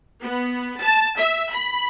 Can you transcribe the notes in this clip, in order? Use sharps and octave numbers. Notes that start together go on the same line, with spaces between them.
B3
A5
E5
B5